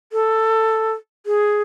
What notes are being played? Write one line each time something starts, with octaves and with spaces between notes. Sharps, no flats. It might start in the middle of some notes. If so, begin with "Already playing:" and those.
A4
G#4